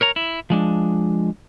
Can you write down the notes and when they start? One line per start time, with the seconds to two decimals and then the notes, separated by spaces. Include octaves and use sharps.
0.01 A#4 C#5 A#5
0.16 E4
0.50 F3 G#3 D4